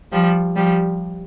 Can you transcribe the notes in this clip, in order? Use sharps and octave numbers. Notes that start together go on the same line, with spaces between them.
F3 G3
F3 G3